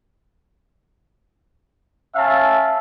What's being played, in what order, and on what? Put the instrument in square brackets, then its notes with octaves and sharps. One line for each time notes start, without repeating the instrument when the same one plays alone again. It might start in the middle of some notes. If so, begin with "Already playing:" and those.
[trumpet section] C#4 E5 F5 A5